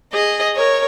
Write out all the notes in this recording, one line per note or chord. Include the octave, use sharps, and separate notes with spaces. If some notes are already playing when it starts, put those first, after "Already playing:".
G#4 D#5
A#4 C#5